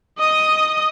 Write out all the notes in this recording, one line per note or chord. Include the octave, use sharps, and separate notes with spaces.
D#5 D#6